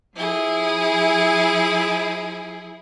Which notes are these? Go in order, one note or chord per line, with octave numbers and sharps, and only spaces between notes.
F3 E4 G#4